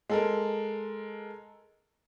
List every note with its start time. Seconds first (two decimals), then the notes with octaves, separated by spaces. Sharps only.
0.09 G#3 A4 A#4